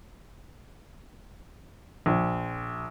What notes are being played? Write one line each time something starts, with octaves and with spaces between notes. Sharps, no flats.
A#1